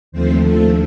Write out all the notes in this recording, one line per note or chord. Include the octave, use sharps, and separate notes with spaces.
D#2 D3 F3 A3 C4 C5
A3 A4